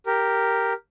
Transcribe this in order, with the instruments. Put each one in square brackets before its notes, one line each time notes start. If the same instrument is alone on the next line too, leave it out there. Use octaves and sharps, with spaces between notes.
[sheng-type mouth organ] G4 A#4